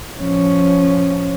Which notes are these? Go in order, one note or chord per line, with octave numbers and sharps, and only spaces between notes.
F3 C#4